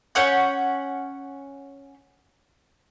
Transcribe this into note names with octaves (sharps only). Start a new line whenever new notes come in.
C#4 C#5 F#5 G6